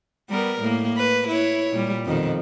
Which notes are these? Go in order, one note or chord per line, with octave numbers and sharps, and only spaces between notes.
G3 B3 A#4
A2 A#3
B4
E4 C#5
A#2 G3
F2 B2 D#3